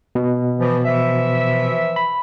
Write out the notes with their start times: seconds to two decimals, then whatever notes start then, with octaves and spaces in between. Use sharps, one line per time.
0.15 B2
0.58 E3 F3
0.84 E3 F3 E5
1.96 B5